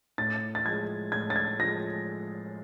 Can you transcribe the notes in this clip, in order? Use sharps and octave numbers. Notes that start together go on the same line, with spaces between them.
A2 A6
A6
F3 G#3 G#6
A2 G#6
A6
G#6
F3 G#3 A#6